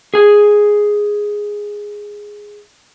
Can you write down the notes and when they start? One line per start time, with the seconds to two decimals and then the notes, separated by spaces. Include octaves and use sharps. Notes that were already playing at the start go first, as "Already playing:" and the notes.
0.14 G#4 G#5